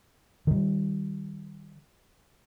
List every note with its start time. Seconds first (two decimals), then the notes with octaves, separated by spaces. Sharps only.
0.47 D#3 G3